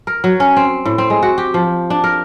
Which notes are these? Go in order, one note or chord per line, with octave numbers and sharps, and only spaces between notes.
A#4
F#3
C#4
C4
A2
C4
G#3
F#4
G4
F3
D4
A#4